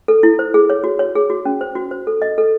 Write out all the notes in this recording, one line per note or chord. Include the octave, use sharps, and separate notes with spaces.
A4
E4
C5
G#4
C#5
F#4
C#5
G#4
F#4
C#4
C5
F#4
C5
A4
D#5
A4